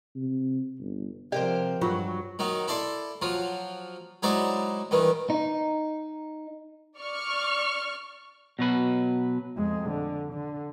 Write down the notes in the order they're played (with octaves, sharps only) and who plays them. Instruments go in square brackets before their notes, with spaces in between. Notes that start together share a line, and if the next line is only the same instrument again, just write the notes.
[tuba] C3
G1
[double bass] C3 F3 [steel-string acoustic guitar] G4 A#4 C5 [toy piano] D5 D#5
[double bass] G2 [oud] F#3 [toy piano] F4
[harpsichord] D#3 F#3 D#4
E4 A4 D5 C6
F3 F#3 F4
F#3 G#3 D#4 E4 C5 D5
G2 D#3 E3
[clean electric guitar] D#4
[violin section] D5 C#6 F6
[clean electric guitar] B2 F#3 B4
[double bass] F2 G#3
D3
D3